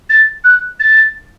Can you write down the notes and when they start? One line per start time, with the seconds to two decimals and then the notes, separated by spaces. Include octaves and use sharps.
0.10 A6
0.44 F#6
0.80 A6